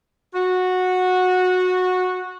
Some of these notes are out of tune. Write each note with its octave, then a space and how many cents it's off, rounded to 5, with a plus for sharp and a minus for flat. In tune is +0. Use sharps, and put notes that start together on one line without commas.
F#4 -15